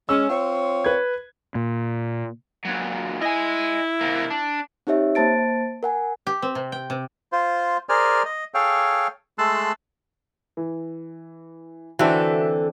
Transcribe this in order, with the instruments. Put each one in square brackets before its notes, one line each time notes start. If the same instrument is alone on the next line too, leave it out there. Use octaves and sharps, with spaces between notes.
[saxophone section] G#3 C#4 [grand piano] E6
[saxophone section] C4 F4 C#5
[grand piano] B4 G#6
[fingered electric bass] A#2
[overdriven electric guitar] A#2 F#3
[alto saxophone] E4 [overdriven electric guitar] D#5 G#5
[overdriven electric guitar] C3 A#3
D4
[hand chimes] C4 D#4 G4 C#5 E5
A#3 C5 A5 A6 D7
A#4 F#5 G#5
[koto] G4
C4
C3
G5
C3
[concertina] F4 C5
G#4 A#4 C5 D5 G#5 F6
D#5
G#4 A4 C#5 F5 G5
G#3 A3 A5 C6 E6 F#6
[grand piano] E3
[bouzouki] D3 A4 [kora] E3 C4 D4 [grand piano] F#4 E5